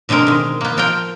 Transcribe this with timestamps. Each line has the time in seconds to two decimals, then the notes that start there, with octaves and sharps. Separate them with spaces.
0.09 B2 D3 G#3 C4 A#4
0.27 D#3 G#3
0.61 A#3 B3
0.77 F3 F4 A#4 G5